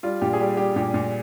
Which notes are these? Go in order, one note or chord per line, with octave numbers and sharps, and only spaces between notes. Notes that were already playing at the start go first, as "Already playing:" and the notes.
G3 F4
A#2 G4
G#4
G3 G4
G3 G4
A#2 G4
A#2